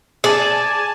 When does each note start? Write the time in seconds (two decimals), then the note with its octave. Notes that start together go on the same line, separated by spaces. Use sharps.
0.24 G#4 D5 G#5 A5